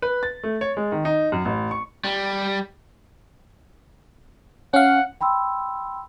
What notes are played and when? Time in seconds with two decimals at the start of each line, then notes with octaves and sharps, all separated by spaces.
0.02 B4
0.23 A6
0.43 A3
0.61 C#5
0.77 G#3
0.92 D#3
1.05 D#4
1.32 F#2
1.45 A1
1.71 C#6
2.04 G3
4.74 C#4 F5 F#5
5.21 G5 B5 C6 E6